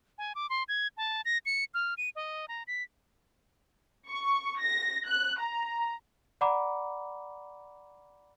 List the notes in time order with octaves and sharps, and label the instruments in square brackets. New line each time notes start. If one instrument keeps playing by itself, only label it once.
[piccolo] G#5
D6
C6
G#6
A5
A#6
C#7
F6
D#7
D#5
A#5
B6
[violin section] C#6
A#6
F#6
A#5
[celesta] D5 F#5 A#5 B5 D6